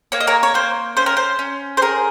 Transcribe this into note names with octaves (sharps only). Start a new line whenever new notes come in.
A#3 C#5
D#5
A#4 C#5
C#5
A#3 C5
C#4 C5
A#4
C5
C#4
C5
G#4 A#4